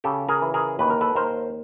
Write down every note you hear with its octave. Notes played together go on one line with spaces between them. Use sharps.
C#3 G4 A4
G#4 A#4
E3
G#4 A#4
D#2 B4
A#4
A4 B4
D#2 A#4 C5